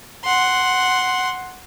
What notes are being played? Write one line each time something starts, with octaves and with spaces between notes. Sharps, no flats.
F#5 C6